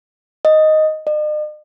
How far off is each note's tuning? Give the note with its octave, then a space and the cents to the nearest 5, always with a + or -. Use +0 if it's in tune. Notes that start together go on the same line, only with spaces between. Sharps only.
D#5 +0
D#5 -45